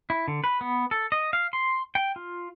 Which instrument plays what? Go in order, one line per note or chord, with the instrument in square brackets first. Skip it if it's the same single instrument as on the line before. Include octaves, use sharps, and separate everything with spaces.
[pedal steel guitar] E4
D3
B4
B3
A4
D#5
F5
C6
G5
F4